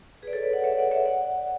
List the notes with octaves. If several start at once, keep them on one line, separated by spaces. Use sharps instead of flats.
G#4 B4
D5
A4 C#5
B4 D5
D5 F#5
C#5 E5
D5 F#5
C#5 E5
D5 F#5